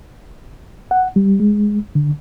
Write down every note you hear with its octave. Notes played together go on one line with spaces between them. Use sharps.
F#5
G3
G#3
D3